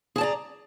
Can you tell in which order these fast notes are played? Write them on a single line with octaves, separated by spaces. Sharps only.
G#4 A5 D5 A#5